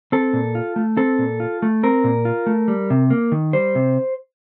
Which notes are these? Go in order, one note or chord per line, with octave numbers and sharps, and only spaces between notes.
C4 A4
A#2
F4
A3
C4 A4
A#2
F4
A3
C4 A#4
A#2
F4
A3
G3
C3
A#3
D#3
G3 C5
C3